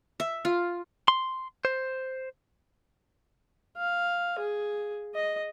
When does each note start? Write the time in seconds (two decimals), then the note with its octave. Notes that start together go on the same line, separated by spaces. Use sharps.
0.20 E5
0.45 F4
1.08 C6
1.65 C5
3.77 F5
4.39 G#4
5.15 D#5